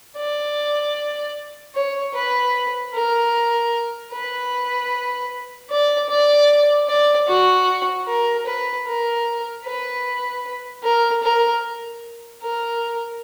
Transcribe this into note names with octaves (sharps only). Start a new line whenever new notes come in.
D5
C#5
B4
A#4
B4
D5
D5
D5
F#4
A#4
B4
A#4
B4
A#4
A#4
A#4